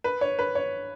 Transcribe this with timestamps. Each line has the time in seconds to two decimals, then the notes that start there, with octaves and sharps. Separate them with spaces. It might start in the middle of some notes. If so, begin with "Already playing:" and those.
0.04 B4
0.21 C#5
0.39 B4
0.55 C#5